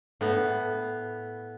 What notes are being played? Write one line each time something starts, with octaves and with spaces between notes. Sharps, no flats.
A2 B3